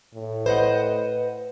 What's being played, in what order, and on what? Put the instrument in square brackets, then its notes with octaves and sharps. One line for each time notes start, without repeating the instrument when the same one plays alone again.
[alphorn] A2
[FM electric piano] B4 [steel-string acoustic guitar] C5 D#5 F#5